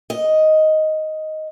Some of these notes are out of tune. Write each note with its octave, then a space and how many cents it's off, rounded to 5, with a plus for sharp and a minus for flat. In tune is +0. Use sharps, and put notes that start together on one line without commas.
D#5 +5